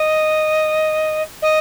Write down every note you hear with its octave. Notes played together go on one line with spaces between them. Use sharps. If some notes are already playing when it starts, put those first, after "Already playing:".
Already playing: D#5
D#5